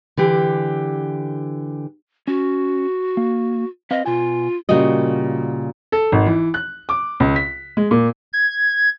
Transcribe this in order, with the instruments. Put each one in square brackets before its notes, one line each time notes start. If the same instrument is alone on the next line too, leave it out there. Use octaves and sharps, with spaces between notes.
[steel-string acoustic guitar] D3 E3 G4
[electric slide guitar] C#4 [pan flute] F#4
[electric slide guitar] A#3
[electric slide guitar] C4 B4 F5 [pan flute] D#5
[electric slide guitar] B2 G#5 [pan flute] F4
[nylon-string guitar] A#2 C#3 G3 F#4 D#5
[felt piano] A4
G#1
E3
F#6
D6
C#2
B6
G#3
A#2
[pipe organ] G#6